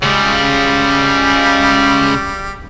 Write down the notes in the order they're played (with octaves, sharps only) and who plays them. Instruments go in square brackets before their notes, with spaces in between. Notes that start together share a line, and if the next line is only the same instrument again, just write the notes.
[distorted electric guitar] C#3 G#3 [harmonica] G3